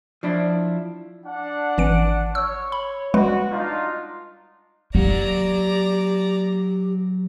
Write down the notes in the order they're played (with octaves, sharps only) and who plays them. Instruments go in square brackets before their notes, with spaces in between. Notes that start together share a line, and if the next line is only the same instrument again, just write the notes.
[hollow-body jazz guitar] F3 D4 E4
[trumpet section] D4 F#5
[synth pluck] G#1 E3 D7
[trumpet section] C#5 [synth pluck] E6
[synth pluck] B5
[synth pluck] G3 G#3 B4 [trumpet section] F#4
[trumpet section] D4 D#4 F4
[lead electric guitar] F#3 F#5 [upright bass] A#3 [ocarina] G4 [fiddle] D5 A#5